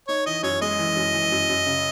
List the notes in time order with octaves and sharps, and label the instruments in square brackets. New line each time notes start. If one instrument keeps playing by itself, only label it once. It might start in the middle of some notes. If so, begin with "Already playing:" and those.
[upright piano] D#4 [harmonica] C#5
[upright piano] E3 [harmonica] D#5
[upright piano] F#2 [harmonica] C#5
[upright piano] G#3 [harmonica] D#5
[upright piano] E3
F#2
E3
F#2
F#2
C#3